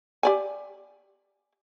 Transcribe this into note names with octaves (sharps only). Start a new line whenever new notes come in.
G4 D5 G#5